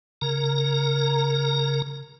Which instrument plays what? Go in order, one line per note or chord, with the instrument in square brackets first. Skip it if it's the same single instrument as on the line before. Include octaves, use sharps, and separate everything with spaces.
[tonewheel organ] C#3 A#4 A#5